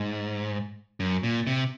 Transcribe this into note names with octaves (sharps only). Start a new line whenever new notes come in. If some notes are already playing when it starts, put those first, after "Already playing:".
Already playing: G#2
F#2
A#2
C3